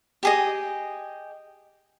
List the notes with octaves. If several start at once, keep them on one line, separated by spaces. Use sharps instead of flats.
G4 G#4 D#5